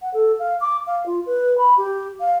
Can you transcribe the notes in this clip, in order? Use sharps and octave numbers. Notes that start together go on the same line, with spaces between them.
F#5
A4
F5
D6
F5
F4
B4
B5
G4
F5